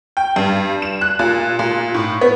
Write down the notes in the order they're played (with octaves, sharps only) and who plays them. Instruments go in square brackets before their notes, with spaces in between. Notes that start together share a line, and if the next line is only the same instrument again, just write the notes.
[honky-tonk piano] G5
G2
E7
F#6
A#2
A#2
A2
B3